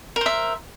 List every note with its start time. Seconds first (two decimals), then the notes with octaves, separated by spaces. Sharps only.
0.16 A#4
0.21 C5
0.26 E5